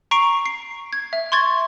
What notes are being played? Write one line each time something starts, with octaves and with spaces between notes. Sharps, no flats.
A#5 C#6 C7 D7
C7
G#6
E5
C6 C#6 G#6 A6